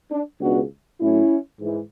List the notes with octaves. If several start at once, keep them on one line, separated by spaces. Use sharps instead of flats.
D4
C#2 B2 G#3 B3 D4 F#4
A2 F#3 A3 C#4 E4
G#2 E3